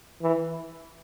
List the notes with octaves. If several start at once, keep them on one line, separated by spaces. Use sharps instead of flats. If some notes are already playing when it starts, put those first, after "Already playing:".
E3